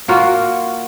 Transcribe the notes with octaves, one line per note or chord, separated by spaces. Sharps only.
A#3 F4 F#4